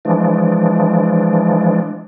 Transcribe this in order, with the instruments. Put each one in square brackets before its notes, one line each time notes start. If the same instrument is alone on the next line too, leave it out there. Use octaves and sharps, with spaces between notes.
[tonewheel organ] E3 F3 G#3 D4